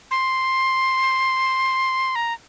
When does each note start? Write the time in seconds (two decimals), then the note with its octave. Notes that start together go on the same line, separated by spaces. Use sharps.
0.11 C6
2.15 A#5